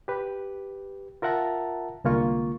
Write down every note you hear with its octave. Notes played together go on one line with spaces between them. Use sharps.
G4 B4
F4 A#4 E5 F#5 A5 A#5
C2 D3 G#3 A#3 F4 C#6